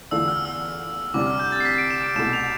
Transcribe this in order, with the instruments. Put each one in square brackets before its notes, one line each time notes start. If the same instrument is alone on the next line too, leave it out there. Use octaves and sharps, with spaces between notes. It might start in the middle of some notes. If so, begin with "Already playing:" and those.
[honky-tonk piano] E2 D3 A3 D4 F4 [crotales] E6
[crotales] F6
E6
[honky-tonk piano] D2 C3 G3 D4 [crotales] D6
[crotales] F6
G6
A6
C7
B6
D7
E7
D7
[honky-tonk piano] C2 B2 A3 [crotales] E7
[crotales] F7